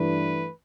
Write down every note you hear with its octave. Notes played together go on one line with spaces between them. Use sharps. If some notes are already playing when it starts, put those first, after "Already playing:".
Already playing: G2 E3 A3 D4 B4